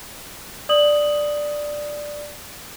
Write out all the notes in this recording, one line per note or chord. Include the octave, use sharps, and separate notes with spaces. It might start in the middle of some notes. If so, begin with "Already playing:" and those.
D5 D#6 F#7